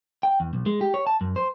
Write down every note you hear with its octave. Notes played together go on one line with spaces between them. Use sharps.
G5
E2
B1
G#3
G4
C#5
A5
F#2
C5